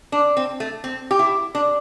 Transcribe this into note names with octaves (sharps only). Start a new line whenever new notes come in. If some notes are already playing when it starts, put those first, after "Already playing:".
D4
C4
A3
C4
G4
E4
D4